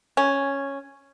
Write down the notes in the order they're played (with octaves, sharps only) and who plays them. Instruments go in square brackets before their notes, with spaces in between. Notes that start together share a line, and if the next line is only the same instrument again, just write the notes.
[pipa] C#4